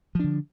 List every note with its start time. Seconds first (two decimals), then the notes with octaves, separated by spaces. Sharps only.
0.15 F3
0.19 D4
0.24 D3